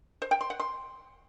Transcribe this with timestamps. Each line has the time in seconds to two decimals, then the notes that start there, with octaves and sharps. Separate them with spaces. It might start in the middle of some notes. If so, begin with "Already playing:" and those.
0.22 C5
0.31 G5
0.41 C6
0.50 F#5
0.60 C6